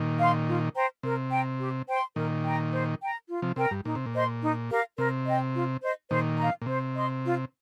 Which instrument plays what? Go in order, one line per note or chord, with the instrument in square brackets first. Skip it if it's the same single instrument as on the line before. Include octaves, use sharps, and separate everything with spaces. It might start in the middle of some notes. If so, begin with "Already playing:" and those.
Already playing: [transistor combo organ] A#2 D#3
[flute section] F5 C6
F4
C5 G5 A#5
[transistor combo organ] C3 [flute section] A#4
[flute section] G5 A#5
G4
C5 G5 C6
[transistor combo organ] A#2 D#3 [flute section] A#4
[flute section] G5 A#5
C5
G5 A#5
F4
[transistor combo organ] C3 F3
[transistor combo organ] C3 [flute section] A#4 G5 A#5
[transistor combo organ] G2
[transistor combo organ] A#2 [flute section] D#4
[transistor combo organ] C3
A#2
[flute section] C5 D#5 C6
D#4
G4 A#4 F5
[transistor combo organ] C3 [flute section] A#4
[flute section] D#5 G5
F4
C5 D#5
[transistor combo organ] A#2 D#3 [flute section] C5
[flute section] F5 A#5
[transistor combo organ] A#2
[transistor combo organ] C3 [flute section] C5
[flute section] D#5 C6
F4